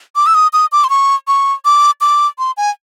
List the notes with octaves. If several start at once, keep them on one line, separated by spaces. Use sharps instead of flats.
D6
E6
D#6
D#6
D6
C6
C#6
C#6
D6
D6
C6
G#5